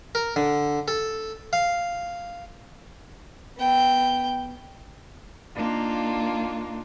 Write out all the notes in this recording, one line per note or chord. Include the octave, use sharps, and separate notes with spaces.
A#4
D3
A4
F5
B3 G5
A#3 D4 D#4 F4